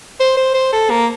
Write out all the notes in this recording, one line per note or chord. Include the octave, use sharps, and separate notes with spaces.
C5
C5
C5
A4
A#3